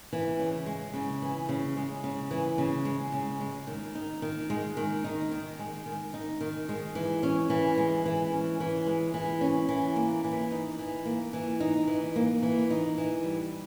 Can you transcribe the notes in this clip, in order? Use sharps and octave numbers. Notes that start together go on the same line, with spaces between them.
E3
C#3
G#3
C#3
E3
C#3
G#3
C#3
E3
C#3
G#3
C#3
G#3
D#3
D#4
D#3
G#3
D#3
D#4
D#3
G#3
D#3
D#4
D#3
G#3
E3
C#4
E3
G#3
E3
C#4
E3
G#3
E3
C#4
E3
A#3
E3
D#4
E3
A#3
E3
D#4
E3
A#3
E3
D#4
E3
G3